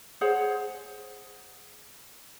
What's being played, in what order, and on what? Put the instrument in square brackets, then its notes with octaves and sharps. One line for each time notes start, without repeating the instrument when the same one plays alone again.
[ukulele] G#4 C5 C#5 F#5